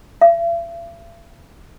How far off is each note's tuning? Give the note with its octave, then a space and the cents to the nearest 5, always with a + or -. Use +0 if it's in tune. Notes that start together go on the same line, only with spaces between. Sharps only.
E5 +45